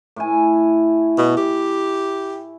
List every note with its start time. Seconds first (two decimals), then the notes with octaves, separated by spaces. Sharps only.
0.16 A2 E4 G#5
1.18 B2
1.37 G4